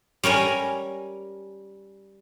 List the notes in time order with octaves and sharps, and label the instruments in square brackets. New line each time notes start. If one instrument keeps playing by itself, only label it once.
[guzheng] G3 C#4 A#4 G#5